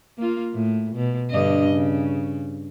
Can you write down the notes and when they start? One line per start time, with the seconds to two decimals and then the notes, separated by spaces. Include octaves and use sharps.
0.18 A#3 F4
0.54 A2
0.96 B2
1.31 G2 D3 D#5
1.69 C#3